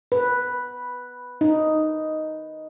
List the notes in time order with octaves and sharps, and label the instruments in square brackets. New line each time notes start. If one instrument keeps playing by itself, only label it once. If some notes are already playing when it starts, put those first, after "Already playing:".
[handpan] B4
D#4